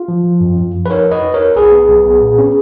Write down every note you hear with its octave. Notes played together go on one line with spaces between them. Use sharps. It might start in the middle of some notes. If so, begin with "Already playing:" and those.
Already playing: F4
F3
F3
F#2
F#2
F3
B4
D#4 A#4 C#5
F2
B4 D#5
D#4
A#4 C#5
D#4
B1 G#4 B4
B3
B1
B3
A#2
C#4